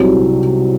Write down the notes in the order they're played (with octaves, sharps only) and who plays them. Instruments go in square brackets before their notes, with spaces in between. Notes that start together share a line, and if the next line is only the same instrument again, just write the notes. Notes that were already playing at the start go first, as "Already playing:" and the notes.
Already playing: [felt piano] C2 C3 F#3